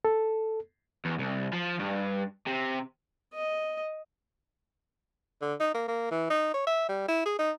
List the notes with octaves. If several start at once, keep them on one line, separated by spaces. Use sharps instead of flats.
A4
E2
C2
F3
G2
C3
D#5
D3
D#4
A#3
A#3
E3
D#4
C#5
E5
G3
E4
G#4
D#4